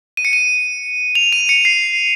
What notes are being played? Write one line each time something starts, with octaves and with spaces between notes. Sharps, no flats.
D#7
C#7
D#7
F7
D#7
C#7
C7